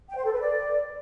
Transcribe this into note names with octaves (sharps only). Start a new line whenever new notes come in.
G5
C5
A4
B4
D5